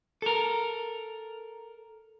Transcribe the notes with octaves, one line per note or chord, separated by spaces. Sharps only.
A4 A#4